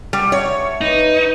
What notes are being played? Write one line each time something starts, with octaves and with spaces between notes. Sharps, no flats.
G3 F#5 G5
D4 C#5 E5
D#4 B4